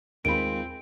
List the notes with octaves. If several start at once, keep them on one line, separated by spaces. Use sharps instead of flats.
D#2 D#3 G#3 C4 F4 B5 D7